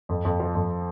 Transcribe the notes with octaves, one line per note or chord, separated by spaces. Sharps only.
F2
F2
F3
F2